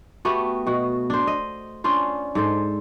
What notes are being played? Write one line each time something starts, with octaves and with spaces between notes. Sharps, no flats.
A3 B3 F#4 G4
B2 F#4
D4 C5
D#5
C#4 D4 F4 C5
G#2 A4 C5